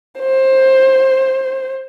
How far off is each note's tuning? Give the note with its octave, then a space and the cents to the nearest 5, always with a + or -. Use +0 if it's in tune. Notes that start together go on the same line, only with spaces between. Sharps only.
C5 +15